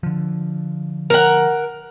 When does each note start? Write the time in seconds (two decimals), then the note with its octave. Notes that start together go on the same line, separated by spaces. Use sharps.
0.03 D3 F3
1.10 A#4 F#5